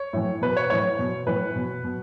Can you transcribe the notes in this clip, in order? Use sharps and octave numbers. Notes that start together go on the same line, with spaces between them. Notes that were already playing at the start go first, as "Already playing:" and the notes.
Already playing: C#5
A2 E3
B2 B4
C#5
A2 E3 C#5
B2
A2 E3 B4
B2
B2